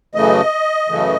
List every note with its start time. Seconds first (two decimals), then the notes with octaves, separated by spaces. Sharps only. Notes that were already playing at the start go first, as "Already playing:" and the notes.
0.14 F#2 C#3 E3 A3 D#5
0.89 F#2 C#3 E3 A3